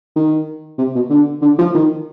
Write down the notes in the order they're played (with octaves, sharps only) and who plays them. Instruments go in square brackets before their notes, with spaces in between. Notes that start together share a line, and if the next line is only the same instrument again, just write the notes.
[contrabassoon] D#3
C3
B2
D3
D3
F3
D#3